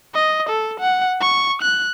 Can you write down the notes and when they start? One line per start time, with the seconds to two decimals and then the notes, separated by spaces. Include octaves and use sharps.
0.14 D#5
0.49 A4
0.80 F#5
1.20 C#6
1.61 F#6